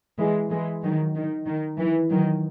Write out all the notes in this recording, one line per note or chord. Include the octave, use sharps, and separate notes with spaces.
E3 G#3
E3 G#3
D#3 F#3
D#3
D#3
E3
D#3 F#3